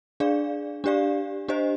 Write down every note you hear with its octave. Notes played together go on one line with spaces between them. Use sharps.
D4 G#4 D5 F5
D4 G4 D5 F5
D4 G4 C5 D#5